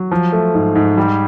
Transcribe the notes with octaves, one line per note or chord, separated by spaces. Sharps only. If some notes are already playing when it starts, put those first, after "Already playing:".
Already playing: F#3
F3
A3
G#2
G#2
G3